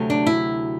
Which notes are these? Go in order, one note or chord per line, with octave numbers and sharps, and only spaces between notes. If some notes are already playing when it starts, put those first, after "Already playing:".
Already playing: D2 C3 F#3 A3
D4
E4